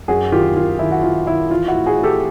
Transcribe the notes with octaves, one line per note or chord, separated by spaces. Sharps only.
F#2 F#4 G#4
D#3 F4 G4
D#3 F4
D#3 E4
F#4
D#3 F4
D#3 E4
E3 F4
E4 F#4
A2
F#4 G#4
A2
G4 A4